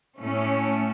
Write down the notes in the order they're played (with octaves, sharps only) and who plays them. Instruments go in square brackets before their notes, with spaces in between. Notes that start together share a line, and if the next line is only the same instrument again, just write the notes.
[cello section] A2 A3 C#4